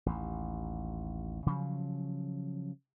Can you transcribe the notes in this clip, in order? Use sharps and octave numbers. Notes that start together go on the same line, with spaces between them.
A1 D#2
C#3 F3 F#3